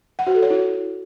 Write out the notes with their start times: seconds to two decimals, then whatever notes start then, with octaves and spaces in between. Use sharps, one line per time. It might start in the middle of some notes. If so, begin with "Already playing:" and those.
0.19 F#5
0.27 F#4
0.35 A4
0.42 C#5
0.50 E4